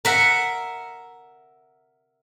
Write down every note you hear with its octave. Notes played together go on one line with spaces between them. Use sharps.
A#4 E5 F#5